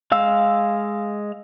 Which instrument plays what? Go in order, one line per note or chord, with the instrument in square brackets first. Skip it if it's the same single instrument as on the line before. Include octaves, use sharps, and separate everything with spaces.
[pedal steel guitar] G#3 F5 E6